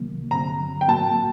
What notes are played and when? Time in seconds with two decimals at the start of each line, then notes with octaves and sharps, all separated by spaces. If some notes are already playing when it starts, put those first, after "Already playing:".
Already playing: C2 C3 D#3 F#3 A#3
0.31 G2 D3 F#3 C4 A#5
0.81 G5
0.88 A2 F#3 A#3 F#4 A5